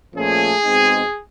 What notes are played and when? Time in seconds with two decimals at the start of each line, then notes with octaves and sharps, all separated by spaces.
0.14 A#2 F3 A3 C#4 G#4
0.64 B2 G#3 C4 D#4